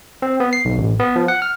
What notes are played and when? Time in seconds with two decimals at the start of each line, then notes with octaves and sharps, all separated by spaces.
0.22 C4
0.40 B3
0.53 C7
0.65 B1
0.78 A1
0.99 B3
1.16 F3
1.28 F#5
1.42 F6